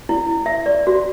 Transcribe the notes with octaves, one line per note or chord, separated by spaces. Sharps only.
E4
E5
D5
F#4